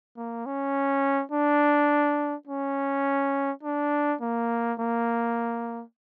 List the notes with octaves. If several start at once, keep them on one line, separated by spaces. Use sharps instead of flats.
A#3
C#4
D4
C#4
D4
A#3
A#3